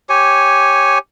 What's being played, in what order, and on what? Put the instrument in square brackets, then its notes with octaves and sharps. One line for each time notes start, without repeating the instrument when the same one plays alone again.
[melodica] G4 C#5 G#5